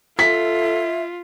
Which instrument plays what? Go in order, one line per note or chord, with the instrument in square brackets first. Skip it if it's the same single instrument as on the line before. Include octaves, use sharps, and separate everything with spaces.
[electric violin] F4 [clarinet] A4 [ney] E5 [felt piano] B6